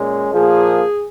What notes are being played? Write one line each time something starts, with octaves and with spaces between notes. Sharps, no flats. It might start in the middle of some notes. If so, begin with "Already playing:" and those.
Already playing: A#2 G#3 C#4
A#2 F3 A#3 G#4